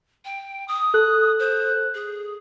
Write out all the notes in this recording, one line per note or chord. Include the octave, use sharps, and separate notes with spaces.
G5
D#6
A4 F#6
C5
G#4